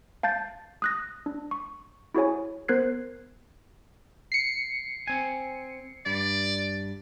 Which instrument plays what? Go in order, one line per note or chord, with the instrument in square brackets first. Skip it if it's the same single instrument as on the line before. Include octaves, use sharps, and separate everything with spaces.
[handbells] F5 A5 G6 A6
D#6 F#6 A#6
D4
C#6
E4 F#4 G#4 C#5 G#5
B3 A#4 C5 F#6 G#6 C7
[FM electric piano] C7 C#7
[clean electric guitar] C4 G#5
[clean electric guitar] G2 [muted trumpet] D5